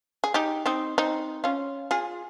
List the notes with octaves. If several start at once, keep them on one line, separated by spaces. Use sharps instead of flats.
G#4
D#4 G4
C4 D#4
C4 D#4
C#4 F4
F4 G#4